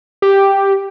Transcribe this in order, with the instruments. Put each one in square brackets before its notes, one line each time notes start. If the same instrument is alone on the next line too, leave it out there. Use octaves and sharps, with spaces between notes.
[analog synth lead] G4